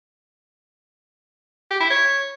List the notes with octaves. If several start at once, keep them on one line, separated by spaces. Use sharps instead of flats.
G4
E4
C#5